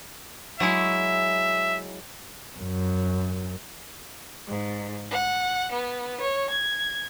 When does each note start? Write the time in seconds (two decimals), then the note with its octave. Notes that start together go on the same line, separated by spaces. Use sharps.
0.60 F#3 G#3 E4 E5
2.58 F#2
4.47 G#2
5.10 F#5
5.71 B3
6.20 C#5
6.49 G#6